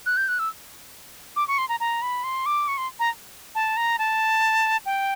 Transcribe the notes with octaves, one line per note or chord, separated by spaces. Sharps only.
F#6
G6
F#6
E6
D6
C#6
C6
A#5
A#5
B5
C6
D6
C#6
C6
A#5
A5
A#5
A5
G5